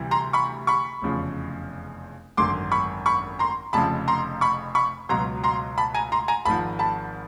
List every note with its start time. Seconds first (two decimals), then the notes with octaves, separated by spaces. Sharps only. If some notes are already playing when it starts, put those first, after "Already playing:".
Already playing: D2 C3 E3 G3
0.11 A#5 C6
0.33 B5 C#6
0.67 B5 C#6
1.02 F1 E2 C#3 F3
2.37 G#1 F#2 D3 C6 D6
2.72 B5 C#6
3.06 B5 C#6
3.39 A#5 C6
3.73 F1 F2 C#3 F3 A5 B5
4.08 A#5 C6
4.41 B5 C#6
4.75 B5 C#6
5.09 C#2 B2 F#3 A#5 C6
5.44 A#5 C6
5.78 A5 B5
5.94 G#5 A#5
6.12 A#5 C6
6.28 G#5 A#5
6.45 G#1 G#2 F3 A5 B5
6.79 A5 B5